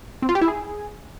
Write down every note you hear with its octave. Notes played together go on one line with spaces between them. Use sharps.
C4
F4
G4
E4
G#4